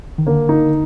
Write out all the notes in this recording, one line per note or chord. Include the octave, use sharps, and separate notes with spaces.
D#3
D3 A#3
D#4